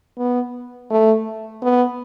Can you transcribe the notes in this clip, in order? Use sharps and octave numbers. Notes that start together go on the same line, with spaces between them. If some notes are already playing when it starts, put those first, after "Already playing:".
B3
A3
B3